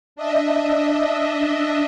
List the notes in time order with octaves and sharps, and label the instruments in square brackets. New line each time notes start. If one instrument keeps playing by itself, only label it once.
[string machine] D4 D#5 E5